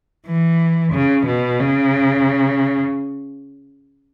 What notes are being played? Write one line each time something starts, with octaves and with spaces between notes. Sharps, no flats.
E3
C#3
B2
C#3